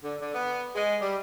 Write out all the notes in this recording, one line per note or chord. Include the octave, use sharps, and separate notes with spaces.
D3
D3
B3
G#3
G3